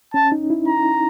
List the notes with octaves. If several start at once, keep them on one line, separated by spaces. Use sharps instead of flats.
C#4 A5
D#4
E4
A#5